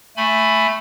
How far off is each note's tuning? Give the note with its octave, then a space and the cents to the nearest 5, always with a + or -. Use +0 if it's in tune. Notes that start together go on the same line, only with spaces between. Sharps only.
A3 +0 G#5 +0 B5 +10